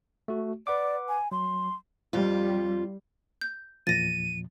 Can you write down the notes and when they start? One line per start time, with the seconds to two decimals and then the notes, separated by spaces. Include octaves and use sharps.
0.28 A3 F#4
0.67 B4 D5 F#5 D6
1.08 G#5
1.32 F#3 C6
2.13 F2 G3 F4
3.41 G6
3.87 E2 A#2 F3 A6 A#6 D#7